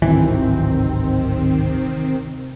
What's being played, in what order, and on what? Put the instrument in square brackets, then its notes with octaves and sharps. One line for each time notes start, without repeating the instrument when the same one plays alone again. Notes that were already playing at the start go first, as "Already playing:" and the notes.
[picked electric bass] D1 G#1 E3 [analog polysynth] C3 D#3 C4